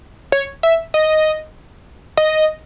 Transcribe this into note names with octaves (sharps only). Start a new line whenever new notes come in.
C#5
E5
D#5
D#5